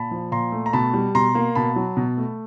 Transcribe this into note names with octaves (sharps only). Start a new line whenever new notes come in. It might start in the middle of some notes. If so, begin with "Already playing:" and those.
Already playing: A#2 A5 B5
F3
A#2 A#5 C6
A3
A#5
B2 A5 B5
G3
B2 A#5 C6
A#3
B2 A5 B5
F#3
B2
A3